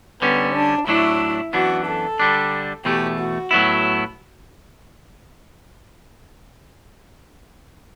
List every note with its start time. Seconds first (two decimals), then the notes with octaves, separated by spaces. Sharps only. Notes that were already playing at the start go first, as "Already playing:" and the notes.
0.22 D3 G3 B3 C#4
0.55 D4
0.87 A2 F#3 A3 D4 E4
1.53 F#2 E3 B3 D4 F#4
1.87 A4
2.20 D3 G3 D4
2.85 E2 B2 A3 G4
3.19 F#4
3.51 A2 F#3 B3 E4